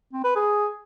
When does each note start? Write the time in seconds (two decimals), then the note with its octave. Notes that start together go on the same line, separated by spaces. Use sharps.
0.13 C4
0.24 B4
0.36 G#4